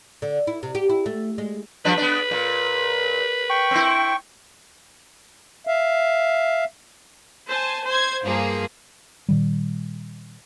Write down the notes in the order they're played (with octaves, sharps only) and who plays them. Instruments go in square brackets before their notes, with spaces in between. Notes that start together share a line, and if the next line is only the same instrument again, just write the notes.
[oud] D3
E4
C3
G4
E4
A3
G#3
[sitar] F3 G3 D4 [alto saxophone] B4
[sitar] B3 D4
A#2
[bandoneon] G5 C#6
[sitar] C4 E4
[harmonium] E5 F5
[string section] C5 G#5 A5
C5 C6 G#6
G2 F3 A#3 G#4
[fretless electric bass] A#2 D#3 G3